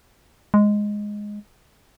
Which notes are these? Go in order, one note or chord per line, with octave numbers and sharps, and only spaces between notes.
G#3